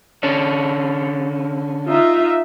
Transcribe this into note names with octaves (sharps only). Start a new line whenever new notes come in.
D3 C#4 D4
D#4 F4 E5